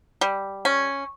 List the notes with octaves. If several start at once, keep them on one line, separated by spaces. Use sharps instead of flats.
G3
C#4